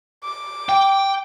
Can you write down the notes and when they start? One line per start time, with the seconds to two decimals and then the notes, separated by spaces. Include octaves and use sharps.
0.24 D6
0.69 G5